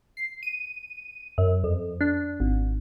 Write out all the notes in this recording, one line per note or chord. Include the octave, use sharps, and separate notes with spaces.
C7
D#7
F#2
F2
D4
G#1